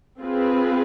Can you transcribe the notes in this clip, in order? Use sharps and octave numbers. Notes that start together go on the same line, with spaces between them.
C4 F4 G#4 B4